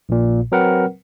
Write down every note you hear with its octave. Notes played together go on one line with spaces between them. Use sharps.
A#1 A#2
F#3 C4 A#4 B4 F#5